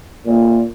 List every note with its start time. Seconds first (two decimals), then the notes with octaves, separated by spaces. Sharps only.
0.26 A#2